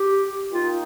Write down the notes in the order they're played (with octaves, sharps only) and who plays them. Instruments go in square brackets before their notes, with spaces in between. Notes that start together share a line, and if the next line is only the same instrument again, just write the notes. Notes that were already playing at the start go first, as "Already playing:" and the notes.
Already playing: [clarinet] G4
[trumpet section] A#3 D#4 A#4 G5 [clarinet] F4